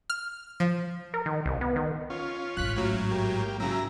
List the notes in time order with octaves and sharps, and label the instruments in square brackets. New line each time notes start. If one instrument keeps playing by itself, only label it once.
[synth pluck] F6
F3
[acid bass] A#4
D#3
C2
B3
D#3
[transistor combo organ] C#4 F4
[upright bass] A1 G#2 [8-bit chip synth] F#6 B6
[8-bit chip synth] A2 F#3
[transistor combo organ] A#3 G4
[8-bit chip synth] C#3 F#3 [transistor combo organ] E4 A#5